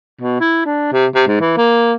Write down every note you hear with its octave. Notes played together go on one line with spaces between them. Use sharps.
B2
E4
D4
C3
C3
G#2
E3
A#3